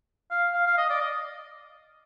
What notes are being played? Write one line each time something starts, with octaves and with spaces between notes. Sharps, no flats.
F5
F5
F5
D#5
D5
D#5